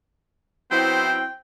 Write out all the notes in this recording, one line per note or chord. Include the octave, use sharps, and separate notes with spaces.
F#3 B3 C4 E4 C5 G5